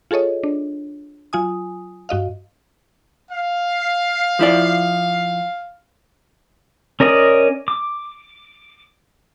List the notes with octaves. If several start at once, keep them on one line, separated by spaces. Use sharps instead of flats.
F4 G#4 A4 C#5 D#5
D4
F#3 F4 G#5 D#6
G2 F#4 D#5 F5
F5
F3 E4 D5
C#4 A#4 D5 D#5
D6